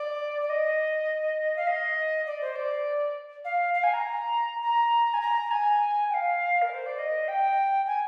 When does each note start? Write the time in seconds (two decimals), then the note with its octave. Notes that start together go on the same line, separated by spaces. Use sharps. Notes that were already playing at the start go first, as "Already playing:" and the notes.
Already playing: D5
0.41 D5
0.49 D#5
1.56 F5
1.67 D#5
2.26 D5
2.41 C5
2.56 D5
3.45 F5
3.74 F5
3.84 G#5
3.94 A#5
4.62 A#5
5.14 G#5
5.21 A#5
5.51 G#5
6.10 G5
6.14 F5
6.62 A#4
6.74 C5
6.86 D5
6.98 D#5
7.28 G5
7.87 G#5